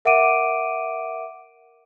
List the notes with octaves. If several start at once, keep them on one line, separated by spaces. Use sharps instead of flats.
A#4 E5 F#5 D6 D7 D#7